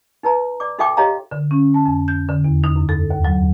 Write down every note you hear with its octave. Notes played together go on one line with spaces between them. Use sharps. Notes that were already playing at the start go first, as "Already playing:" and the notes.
D#4 B4 A#5
D5 D6
D#4 F#4 A4 E5 G5 D6
G4 C#5 D#5 F5 A#5
D3
C#4
A5
F2
G6
D3
E2
D#4
F#2
A4
D#2
F#3